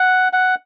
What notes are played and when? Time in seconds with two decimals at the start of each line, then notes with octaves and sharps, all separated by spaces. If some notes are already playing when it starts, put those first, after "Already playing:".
Already playing: F#5
0.33 F#5